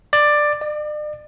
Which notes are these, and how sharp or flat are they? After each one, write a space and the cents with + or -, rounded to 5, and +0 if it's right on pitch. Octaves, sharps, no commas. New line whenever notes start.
D5 +10
D5 +40